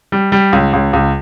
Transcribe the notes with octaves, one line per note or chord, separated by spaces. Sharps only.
G3
G3
C#2
C#2
C#2